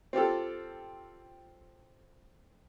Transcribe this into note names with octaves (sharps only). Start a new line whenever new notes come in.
C4 F4 G4 A4